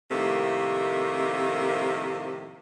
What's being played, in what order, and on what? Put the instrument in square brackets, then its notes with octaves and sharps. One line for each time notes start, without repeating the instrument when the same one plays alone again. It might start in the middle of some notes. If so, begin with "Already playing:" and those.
[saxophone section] A2 C3 D#3 F3 A3 A#3